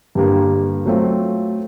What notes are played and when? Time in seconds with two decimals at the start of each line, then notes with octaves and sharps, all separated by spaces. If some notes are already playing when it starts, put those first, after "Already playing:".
0.15 G2 D3 G3 A#3
0.86 F#3 A3 C4 F4